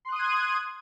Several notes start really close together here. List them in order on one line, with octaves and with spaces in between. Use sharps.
C6 F#6 D#6 D#7 G#6